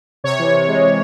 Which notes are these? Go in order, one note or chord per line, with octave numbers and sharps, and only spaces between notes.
C3 C#5
E3
C3
G#3
C3